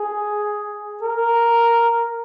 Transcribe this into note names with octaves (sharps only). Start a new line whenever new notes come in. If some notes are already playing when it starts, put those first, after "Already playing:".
Already playing: G#4
A#4